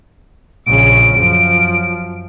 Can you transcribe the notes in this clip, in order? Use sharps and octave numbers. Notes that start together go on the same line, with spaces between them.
A#1 C#3 D7
F#2 F3